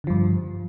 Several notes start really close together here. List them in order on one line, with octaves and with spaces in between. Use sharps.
D3 F3 G2